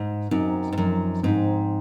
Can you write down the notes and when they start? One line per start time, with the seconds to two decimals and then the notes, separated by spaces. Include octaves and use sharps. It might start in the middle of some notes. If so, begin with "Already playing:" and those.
Already playing: G#2
0.31 F#2 C4 D#4
0.72 G#2
0.78 F#2 F3
1.24 G#2 C4 D#4